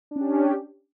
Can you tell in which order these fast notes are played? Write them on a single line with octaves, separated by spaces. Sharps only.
D4 C#4 G4